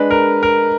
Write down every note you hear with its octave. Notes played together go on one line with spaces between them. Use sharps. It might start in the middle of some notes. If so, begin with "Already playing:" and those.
Already playing: G#3 D4 G#4 B4
A#4
A#4